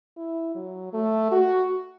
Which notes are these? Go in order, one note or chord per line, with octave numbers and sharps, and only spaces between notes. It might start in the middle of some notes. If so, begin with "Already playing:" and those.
E4
F#3
A3
F#4